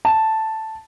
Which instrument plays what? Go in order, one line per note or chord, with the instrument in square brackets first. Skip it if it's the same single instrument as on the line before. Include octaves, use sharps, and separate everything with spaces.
[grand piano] A5